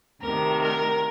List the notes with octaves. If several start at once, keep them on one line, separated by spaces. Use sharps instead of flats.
D2 C3 D#3 A#4
A#4